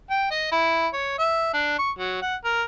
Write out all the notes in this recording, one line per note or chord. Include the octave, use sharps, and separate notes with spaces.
G5
D#5
E4
C#5
E5
D4
C#6
F#3
F#5
A#4